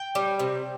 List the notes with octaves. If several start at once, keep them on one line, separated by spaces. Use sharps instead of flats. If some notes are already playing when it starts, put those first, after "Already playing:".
Already playing: G5
G3
C3